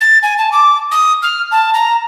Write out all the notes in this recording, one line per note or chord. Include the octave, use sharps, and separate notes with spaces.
A6
G#5
A5
D6
D#6
F6
A5
A#5